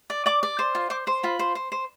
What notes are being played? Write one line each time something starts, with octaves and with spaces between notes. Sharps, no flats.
D5
D5 D6
D5
C5
F4
C5 D6
C5 C6
F4 B5
C5
C5
C5